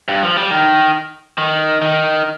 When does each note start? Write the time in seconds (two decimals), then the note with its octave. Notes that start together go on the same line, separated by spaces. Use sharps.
0.08 G2
0.22 F3
0.37 G3
0.51 D#3
1.38 D#3
1.82 D#3